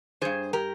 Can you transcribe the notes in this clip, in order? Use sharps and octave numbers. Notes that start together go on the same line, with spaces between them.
G2 D#3 G#4 C5
G4 A#4